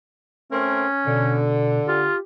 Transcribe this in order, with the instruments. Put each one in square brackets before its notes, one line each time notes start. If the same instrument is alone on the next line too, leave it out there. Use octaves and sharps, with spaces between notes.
[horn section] A3 C4 A#4 [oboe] C#4
[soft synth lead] B2 [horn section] D3
[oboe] F4 [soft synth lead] G4